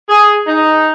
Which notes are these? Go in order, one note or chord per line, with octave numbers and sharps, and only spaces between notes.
G#4
D#4